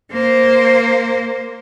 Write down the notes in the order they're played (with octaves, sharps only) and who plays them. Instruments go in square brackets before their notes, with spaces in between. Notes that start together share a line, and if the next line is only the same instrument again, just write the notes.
[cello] A#3 C5